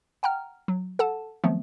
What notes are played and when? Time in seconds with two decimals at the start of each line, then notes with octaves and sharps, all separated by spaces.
0.23 F#5 G5 A#5 F6
0.68 F#3
0.99 A4 F#5 A5
1.44 D#3 F3 F#3 A3 B3 C4